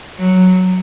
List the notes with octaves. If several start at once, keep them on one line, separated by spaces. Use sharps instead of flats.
F#3